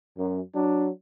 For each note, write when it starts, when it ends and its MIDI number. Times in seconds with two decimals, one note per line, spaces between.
0.17 0.40 42
0.55 0.89 54
0.55 0.89 62